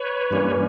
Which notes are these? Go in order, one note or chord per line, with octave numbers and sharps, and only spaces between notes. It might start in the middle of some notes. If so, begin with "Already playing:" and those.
Already playing: B4 C#5
G2 E3 G3 A#3 C#4